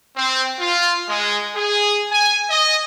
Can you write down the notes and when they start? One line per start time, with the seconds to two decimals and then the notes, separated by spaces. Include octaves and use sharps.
0.16 C4
0.59 F4
1.09 G#3
1.56 G#4
2.11 G#5
2.50 D#5